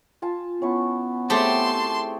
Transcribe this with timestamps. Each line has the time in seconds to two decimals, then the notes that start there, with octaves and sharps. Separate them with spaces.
0.22 F4 G#5 A5
0.62 B3 C#4 E4 C#6
1.30 A3 C4 G4 G#4 C#5 G5 A5 C6